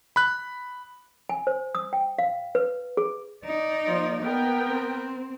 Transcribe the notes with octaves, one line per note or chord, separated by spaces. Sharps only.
B5 F#6
G#5
C5
D#6
G5
F5
B4
G#4
D#4 D5
F3 A#3
B3 A#4 G5
C4